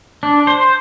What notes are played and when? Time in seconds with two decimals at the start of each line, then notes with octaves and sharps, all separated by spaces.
0.23 D4
0.47 C5